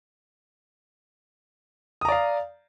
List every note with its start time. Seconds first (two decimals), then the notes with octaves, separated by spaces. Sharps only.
2.01 D#6
2.05 A#5
2.09 D5
2.12 F5